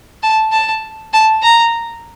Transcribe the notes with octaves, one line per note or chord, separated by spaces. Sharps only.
A5
A5
A5
A#5